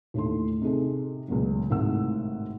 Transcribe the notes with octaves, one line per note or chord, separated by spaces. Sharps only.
D#2 A2 D3 A3 C6
C3 D#4 G#4 A4
C#2 A#2 F#3
G#1 A2 C3 A#4 F#5 E6